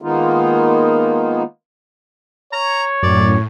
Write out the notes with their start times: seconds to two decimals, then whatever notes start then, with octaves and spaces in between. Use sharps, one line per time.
0.02 D#3 G#3 A#3 B3 D#4 F4
2.53 C#5 A#5
3.03 F#2 A2 D5